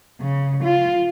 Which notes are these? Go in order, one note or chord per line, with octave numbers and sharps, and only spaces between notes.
C#3
F4